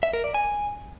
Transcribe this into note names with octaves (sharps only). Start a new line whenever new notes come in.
E5
A#4
D5
G#5